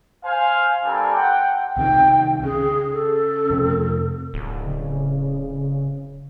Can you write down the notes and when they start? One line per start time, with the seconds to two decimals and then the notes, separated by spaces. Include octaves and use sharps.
0.25 C5 F5 G#5
0.83 G3 A#3 C4 D4 A4 G#5
1.15 F#5 G5
1.77 C2 C3 D#3 G5
2.44 C#3 G#4
2.93 A4
3.50 F2 C3
4.34 D1
4.65 C#3